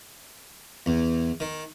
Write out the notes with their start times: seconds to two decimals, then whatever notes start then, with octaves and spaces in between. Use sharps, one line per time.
0.86 E2
1.40 D#3